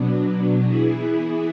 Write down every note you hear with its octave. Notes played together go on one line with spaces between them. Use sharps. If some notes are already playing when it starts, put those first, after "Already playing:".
Already playing: B2 F#3 B3 D4
E3 B3 E4 G#4